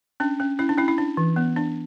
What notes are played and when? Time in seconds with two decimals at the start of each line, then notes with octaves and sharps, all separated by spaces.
0.20 C#4 D4
0.40 C#4
0.59 C#4 E4
0.69 D4
0.78 C#4 E4
0.88 E4
0.98 D4
1.17 E3
1.36 B3
1.56 D4